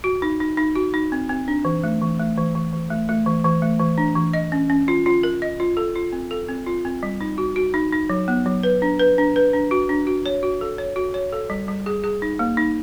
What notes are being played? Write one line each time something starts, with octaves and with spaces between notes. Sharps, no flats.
F#4
D#4
D#4
D#4
F#4
D#4
C4
C4
D4
E3
A3
E3
A3
E3
E3
E3
A3
A3
E3
E3
A3
E3
D4
E3
D#5
C#4
C#4
F4
F4
A#4
D#5
F4
A4
F4
C4
A4
C4
F4
C4
G3
D#4
F#4
F#4
D#4
D#4
F#3
B3
F#3
B4
D4
B4
D4
B4
D4
F#4
D4
F#4
C#5
F#4
A4
C#5
F#4
C#5
A4
G3
G3
G#4
G#4
D#4
A#3
D#4